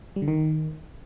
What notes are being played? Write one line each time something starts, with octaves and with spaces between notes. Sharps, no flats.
G3
D3
D#3